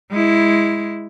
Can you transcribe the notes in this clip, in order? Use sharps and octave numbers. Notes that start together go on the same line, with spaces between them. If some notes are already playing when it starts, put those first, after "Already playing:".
G#3 E4